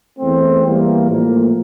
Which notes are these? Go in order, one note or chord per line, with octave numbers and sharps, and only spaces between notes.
E2 E3 A3 C4
E2 E3 G3 A#3
A2 F3 A#3